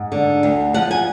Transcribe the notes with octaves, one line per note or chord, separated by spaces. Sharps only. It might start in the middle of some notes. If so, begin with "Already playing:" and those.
Already playing: G#2 F#5
D3
D2
F3 F#5
G#5